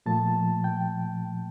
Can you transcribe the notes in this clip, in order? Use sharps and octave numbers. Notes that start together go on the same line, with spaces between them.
A#2 F3 A3 A5
G5